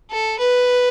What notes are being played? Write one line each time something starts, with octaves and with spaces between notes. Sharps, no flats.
A4
B4